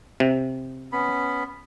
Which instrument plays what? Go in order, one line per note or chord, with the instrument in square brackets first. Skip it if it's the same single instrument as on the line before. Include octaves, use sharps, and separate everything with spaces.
[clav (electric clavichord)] C3
[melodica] B3 C#4 B5